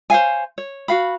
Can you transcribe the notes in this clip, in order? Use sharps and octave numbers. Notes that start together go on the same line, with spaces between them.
C5 C#5 F5 G#5
C#5
F#4 F5 B5